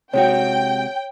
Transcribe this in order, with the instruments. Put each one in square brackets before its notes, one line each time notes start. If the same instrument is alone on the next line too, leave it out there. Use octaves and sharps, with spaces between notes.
[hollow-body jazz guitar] C3 G#3 F#4 [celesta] C#5 [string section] G5